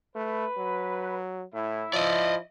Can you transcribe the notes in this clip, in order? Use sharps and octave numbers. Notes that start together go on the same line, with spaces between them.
A3 B4
F#3
A2 E4
F3 D5 D#5